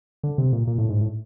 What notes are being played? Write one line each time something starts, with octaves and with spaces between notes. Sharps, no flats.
D3
C3
A#2
A#2
A2
G#2
A2